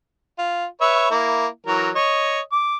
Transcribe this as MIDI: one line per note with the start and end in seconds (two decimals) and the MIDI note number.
0.38 0.65 65
0.81 1.10 71
0.81 1.10 73
0.81 1.10 76
1.11 1.47 58
1.11 1.47 64
1.66 1.90 52
1.66 1.90 54
1.66 1.90 70
1.96 2.40 73
1.96 2.40 75
2.52 2.77 86